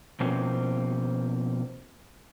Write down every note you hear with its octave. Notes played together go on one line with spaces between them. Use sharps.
B2 F3 A#3 C4 C#4